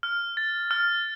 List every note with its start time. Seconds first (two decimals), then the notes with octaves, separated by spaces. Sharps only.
0.03 F6
0.37 A6
0.71 F6